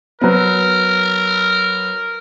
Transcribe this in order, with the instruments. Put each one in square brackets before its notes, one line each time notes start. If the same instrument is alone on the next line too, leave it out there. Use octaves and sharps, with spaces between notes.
[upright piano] F#3 B3 [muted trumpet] A#4